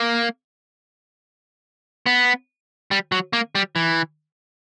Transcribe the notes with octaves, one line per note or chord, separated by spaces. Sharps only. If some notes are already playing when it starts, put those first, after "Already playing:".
Already playing: A#3
B3
G3
F#3
A#3
G3
E3